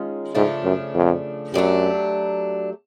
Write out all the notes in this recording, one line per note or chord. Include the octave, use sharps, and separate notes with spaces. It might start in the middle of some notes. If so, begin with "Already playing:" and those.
Already playing: D#3 G#3 C#4 F4
G#2 C#3 F3 A3 D4
F#2
F2
F#2 F#3 A3 D4 G4